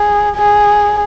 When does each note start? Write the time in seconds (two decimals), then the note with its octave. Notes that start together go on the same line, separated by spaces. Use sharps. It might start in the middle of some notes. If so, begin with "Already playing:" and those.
Already playing: G#4
0.37 G#4